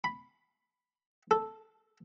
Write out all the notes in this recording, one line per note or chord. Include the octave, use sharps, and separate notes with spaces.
B5
A4